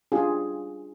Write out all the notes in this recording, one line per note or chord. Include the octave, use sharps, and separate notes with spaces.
D4 F4 G4 G#4